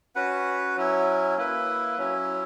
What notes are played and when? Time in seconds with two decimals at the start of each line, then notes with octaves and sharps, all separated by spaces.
0.16 C#4 F#4 B4 F#5
0.77 F#3 C#4 E4
1.37 A#3 E4 B4
1.98 F#3 C#4 E4